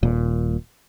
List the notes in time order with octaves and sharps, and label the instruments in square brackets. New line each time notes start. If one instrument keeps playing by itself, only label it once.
[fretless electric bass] D#1 A#2